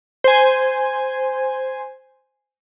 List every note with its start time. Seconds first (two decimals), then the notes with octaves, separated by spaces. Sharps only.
0.24 C5 G#5